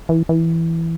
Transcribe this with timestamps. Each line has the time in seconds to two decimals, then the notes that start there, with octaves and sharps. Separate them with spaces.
0.09 E3
0.29 E3